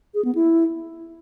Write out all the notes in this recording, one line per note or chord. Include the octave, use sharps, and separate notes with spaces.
G#4
B3
E4